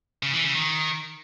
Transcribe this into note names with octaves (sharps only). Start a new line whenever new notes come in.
C#3
E3
C#3
D#3